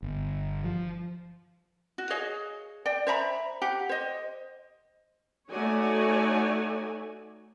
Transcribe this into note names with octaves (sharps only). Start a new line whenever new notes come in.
G1
F3
F#4
G#4 C#5 D#5 F5
D5 G5
C5 E5 A#5 B5
G4 F#5
C5 D#5
A3 D#4 F#4 C#5 D5 G#5